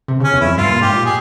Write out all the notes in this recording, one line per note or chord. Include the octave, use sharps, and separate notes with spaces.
C3
C#3 C#4
E2
F2 E4
G2 F4
A#2
G#2 G4
A#2
G#4